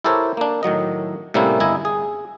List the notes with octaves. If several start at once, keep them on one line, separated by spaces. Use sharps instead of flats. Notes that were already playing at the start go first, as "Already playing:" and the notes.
E4 G4 A4 A#4 C5 C#5
A#3 D4
A2 D#3 F#3 D#5
A2 C3 G3 A#3 C#4 E4
G1 E4 D#5 G#5 A#5
G#4